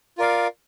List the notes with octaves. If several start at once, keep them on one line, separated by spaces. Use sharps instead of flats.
F4 A#4 D5 F5